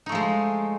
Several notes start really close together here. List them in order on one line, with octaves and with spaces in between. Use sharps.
D#4 A3 F3 G#3